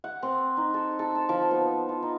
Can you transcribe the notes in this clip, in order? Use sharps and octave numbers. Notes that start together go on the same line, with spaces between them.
F#5
C4
D#4
A4
A4
A5
F3
B3
F4
D#4